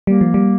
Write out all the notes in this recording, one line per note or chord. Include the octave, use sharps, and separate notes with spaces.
G3 A#3
F3
G3